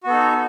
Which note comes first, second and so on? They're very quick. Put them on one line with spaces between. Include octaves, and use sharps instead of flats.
F#4 B3 A4 D#4